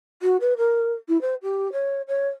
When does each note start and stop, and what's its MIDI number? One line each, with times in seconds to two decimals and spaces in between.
0.22 0.37 66
0.41 0.54 71
0.57 0.93 70
1.09 1.20 64
1.21 1.35 72
1.43 1.71 67
1.73 2.02 73
2.08 2.28 73